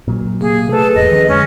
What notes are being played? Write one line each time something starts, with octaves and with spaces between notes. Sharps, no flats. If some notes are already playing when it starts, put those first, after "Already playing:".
A#2 F#3
C3 A#3 G#4
A3 G#4 A4 B4
D#1 E2 G#2 D#5
D#3 F3 C#4
F2 D3 G#3 C#4